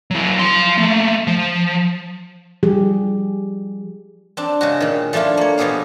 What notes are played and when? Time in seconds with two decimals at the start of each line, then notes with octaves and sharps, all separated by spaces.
0.11 F#3 E4
0.39 F3 C6
0.78 A3 A#3
1.27 F3
2.63 F3 G3 G4 G#4
4.37 C4 D4
4.61 C#3 G#3 F#4
4.80 A#2 D#3
5.13 F3 A3 D4 E4 F4
5.37 A#3 C#5
5.58 B2 F3 B3 G4 G#4 F5